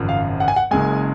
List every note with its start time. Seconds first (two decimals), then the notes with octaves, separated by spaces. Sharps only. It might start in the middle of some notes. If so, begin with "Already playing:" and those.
Already playing: G#1 F#2 C#3 F3
0.09 F5
0.40 F#5
0.48 G#5
0.56 F#5
0.71 F#1 F#2 C#3 G#3 G#5